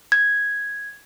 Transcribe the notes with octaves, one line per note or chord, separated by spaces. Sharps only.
G#6